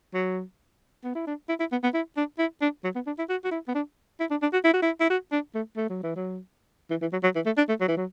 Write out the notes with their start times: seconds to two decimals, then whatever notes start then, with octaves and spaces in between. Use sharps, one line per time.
0.14 F#3
1.04 B3
1.15 E4
1.27 D4
1.49 E4
1.60 E4
1.72 B3
1.83 B3
1.94 E4
2.17 D4
2.39 E4
2.62 D4
2.84 F#3
2.95 B3
3.07 D4
3.19 E4
3.30 F#4
3.44 F#4
3.52 E4
3.68 B3
3.75 D4
4.20 E4
4.31 D4
4.42 D4
4.53 F#4
4.64 E4
4.74 F#4
4.82 E4
5.00 E4
5.10 F#4
5.32 D4
5.55 A3
5.77 A3
5.90 F#3
6.03 E3
6.16 F#3
6.91 E3
7.01 E3
7.13 F#3
7.24 F#3
7.35 E3
7.46 A3
7.57 D4
7.69 A3
7.81 F#3
7.88 E3
7.97 F#3